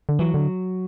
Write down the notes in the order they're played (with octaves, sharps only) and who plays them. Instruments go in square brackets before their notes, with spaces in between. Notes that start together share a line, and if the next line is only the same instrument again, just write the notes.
[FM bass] D3
[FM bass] E3 [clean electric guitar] F#3
[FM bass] D3